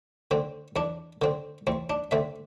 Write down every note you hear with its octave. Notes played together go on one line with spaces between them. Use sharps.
D3 C4
E2 D4
D3 C4
E2 C4
D4
D3 C4 E5